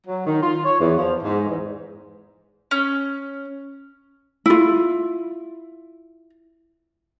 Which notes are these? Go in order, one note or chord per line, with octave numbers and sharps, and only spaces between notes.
F#3
D#3
F4
C#5
E2
F3
G#2
E2
C#4
E4 F4